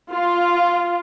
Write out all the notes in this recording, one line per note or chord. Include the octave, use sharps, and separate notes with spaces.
F4